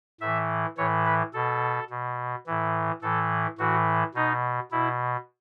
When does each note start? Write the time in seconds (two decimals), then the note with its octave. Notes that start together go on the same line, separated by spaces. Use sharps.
0.21 A2 E3 E5
0.77 A2 E3 C#5
1.06 B4
1.34 B2 A4
1.90 B2
2.47 A2 E3
3.02 A2 E3 A4
3.58 A2 E3 F#4
4.15 B2 D#4
4.72 B2 E4